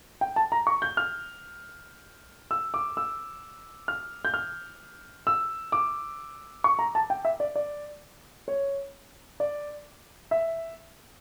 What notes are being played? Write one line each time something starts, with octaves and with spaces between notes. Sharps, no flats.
G5
A5
A#5
C#6
G6
F6
E6
D6
E6
F6
G6
F6
E6
D6
C#6
A#5
A5
G5
E5
D5
D5
C#5
D5
E5